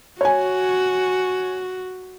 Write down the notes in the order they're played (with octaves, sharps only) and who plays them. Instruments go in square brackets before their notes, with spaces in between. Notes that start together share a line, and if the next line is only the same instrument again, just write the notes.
[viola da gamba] F#4 [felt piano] C#5 G#5